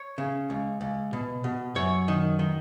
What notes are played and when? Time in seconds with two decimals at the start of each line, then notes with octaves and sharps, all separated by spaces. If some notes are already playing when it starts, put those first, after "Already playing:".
Already playing: C#5
0.18 C#3
0.50 C#2
0.81 C#2
1.13 B2
1.44 B2
1.75 F#2 C#5
2.08 D#3
2.39 D#3